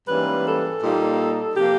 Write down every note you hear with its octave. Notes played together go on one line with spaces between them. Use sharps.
G#2 E3 G3 A#3 C#4 B4
A4
A#2 G3 A#3 D#4
C3 F3 A#3 G4